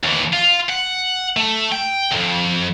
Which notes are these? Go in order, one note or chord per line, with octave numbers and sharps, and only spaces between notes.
D#2 E3
F4
F#5
A3
G5
C2 F2